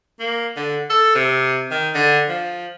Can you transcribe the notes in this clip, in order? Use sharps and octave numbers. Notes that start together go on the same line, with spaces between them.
A#3
D3
A4
C3
D#3
D3
F3